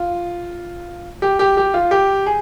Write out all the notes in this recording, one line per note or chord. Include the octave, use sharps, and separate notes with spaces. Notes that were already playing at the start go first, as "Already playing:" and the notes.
Already playing: F4
G4
G4
G4
F4
G4
G#4